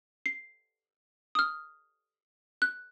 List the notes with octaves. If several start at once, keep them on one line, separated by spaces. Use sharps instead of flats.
C7
D#6 F6
F#6